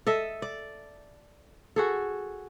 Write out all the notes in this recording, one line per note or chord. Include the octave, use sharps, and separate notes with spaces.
A4 D#5 E5
D5
F#4 G#4 A4